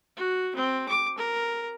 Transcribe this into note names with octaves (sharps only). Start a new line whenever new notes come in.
F#4
C4
D6
A#4